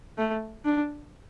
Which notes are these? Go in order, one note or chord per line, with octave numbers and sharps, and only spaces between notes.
A3
D4